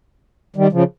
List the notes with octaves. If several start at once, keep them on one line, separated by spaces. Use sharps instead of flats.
D#3 G3
C#3 F3